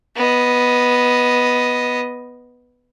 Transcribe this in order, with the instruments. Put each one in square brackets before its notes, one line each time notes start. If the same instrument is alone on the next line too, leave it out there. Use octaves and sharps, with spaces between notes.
[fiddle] B3 D#5